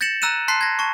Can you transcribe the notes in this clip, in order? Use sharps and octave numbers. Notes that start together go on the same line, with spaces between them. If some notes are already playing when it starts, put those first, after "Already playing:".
G6 A6 A#6 C#7 E7 F#7
A#5 E6 F#6 D#7 E7
A5 C6 F#6 B6 C7
G#6 A#6
A5 C#6